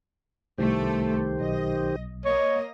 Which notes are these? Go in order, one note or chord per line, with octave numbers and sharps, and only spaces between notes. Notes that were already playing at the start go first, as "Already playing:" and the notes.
C2 D#3 A3 G4 A4 C5
B1 D#5
A#3 C#5 D#5